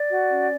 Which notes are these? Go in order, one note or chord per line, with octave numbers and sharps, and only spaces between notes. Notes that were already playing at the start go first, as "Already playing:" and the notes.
Already playing: D5
F#4
C#4